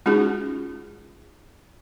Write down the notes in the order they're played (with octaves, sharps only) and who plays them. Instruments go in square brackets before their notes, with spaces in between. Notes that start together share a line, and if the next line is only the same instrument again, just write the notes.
[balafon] G#3 C#4 D#4 F4 F#4 G#4